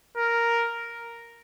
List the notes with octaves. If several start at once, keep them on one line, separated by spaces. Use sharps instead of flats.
A#4